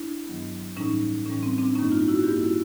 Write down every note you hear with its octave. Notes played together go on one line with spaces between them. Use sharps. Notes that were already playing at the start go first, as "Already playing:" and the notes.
Already playing: D4 E4
G2 D#3 F#3 B3
A2 E3 G3 C#4 D#4
A2 E3 G3 C#4
C4
C4 D4
G2 D#3 G3 A#3 C#4 D#4
D#4 F4
E4 F#4
G2 D#3 G3 A#3 F4 G4
E4 F#4